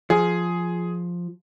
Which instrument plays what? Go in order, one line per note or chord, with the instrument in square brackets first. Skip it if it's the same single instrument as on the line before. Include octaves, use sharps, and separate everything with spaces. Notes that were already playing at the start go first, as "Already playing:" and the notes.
[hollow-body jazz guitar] F3 [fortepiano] G#4